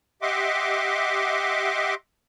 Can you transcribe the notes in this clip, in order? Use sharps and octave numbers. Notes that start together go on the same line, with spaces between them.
G4 D#5 E5 F#5 C6 D6